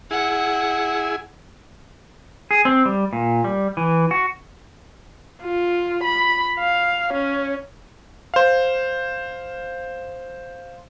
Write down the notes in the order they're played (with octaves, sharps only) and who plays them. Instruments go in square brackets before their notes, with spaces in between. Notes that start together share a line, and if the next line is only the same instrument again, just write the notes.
[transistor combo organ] E4 G#4 [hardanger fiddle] F#5
[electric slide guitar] G#4
C4
G3
A#2
G3
E3
F#4
[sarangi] F4
B5
F5
C#4
[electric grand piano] C5 F5